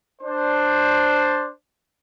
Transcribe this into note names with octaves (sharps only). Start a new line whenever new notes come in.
D4 C5